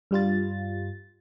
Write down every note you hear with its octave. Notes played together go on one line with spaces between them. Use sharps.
G2 G3 F4 A6